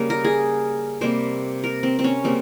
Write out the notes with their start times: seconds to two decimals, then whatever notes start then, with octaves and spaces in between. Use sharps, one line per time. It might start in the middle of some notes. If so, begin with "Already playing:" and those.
Already playing: C#3 G3 A#3
0.10 A#4
0.24 G#4
1.01 C3 G3 A#3 C5
1.64 A#4
1.83 C4
1.99 C4
2.04 C#4
2.24 C#3 G3 A#3 C4